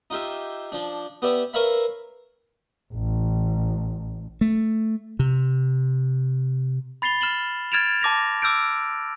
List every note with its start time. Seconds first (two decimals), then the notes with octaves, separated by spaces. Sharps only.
0.10 D#4 F4 G4 E5
0.72 F3 D4
1.22 B3 G4 D5 E5
1.53 A#4 B4 C#5 E5 F5 B5
2.93 A1
4.41 A3
5.19 C3
7.02 B5 A6 C7 F7 G7
7.21 F6 E7 F#7 G7
7.72 F6 G#6 A6 D7 E7 F7
8.01 A5 D6 A#6 F7
8.42 D6 E6 F6 G6 D7